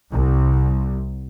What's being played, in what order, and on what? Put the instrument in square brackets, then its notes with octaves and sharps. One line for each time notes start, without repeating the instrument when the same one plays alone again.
[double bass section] C2